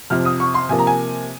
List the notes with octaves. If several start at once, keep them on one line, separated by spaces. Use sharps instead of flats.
F2 C3 F3 F6
D#6
C#6
C6
C3 F3 A#3 G#5
A#5
G#5